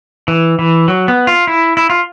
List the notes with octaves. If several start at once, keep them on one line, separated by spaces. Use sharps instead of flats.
E3
E3
F#3
B3
F4
E4
E4
F4